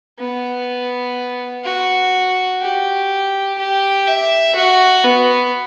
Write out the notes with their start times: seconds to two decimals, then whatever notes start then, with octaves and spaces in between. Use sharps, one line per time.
0.19 B3
1.65 F#4
2.61 G4
3.59 G4
4.07 E5
4.56 F#4
5.05 B3